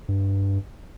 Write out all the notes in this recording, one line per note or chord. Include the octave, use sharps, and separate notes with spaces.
G2